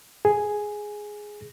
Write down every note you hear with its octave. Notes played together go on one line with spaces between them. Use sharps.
G#4